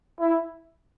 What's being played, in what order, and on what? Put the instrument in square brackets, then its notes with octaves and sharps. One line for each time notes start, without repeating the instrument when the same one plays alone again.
[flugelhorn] E4